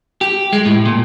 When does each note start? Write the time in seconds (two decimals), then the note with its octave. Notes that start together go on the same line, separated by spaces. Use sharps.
0.21 G4
0.53 G#3
0.66 A2
0.86 A#2